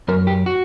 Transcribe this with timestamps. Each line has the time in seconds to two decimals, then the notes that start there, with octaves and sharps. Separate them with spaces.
0.08 F#2 A#4
0.27 G4
0.46 F#4